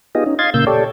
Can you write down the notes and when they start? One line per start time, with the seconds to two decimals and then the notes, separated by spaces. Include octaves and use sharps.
0.15 B3 D#4 F4 G4 G#4 D#5
0.26 C#4 D#4
0.39 D#5 F5 C6 G#6 A6
0.54 A#2 C#3 A#3 E6 G6
0.67 G4 A4 C#5 D5